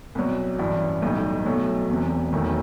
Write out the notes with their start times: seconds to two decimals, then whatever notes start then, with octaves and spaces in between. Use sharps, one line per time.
0.15 C2 B2 F#3
0.59 A1 G2 E3
1.02 B1 A2 G3 D#4
1.45 B1 B2 F#3 A3
1.89 E1 E2 C3
2.32 E1 E2 D#3 F#3 A3